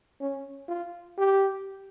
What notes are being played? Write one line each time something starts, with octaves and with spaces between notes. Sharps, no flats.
C#4
F4
G4